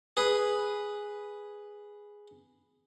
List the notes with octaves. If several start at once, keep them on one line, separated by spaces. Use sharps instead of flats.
G#4 B4